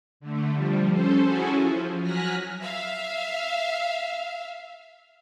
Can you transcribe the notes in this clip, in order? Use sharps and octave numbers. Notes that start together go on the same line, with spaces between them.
D3 A3
F3 G3
C#4 A4 C5
C#4 E4 F#4 G#4 A4 G#5
F3
F#3 G#5 F6 F#6 A#6 B6
E5 F5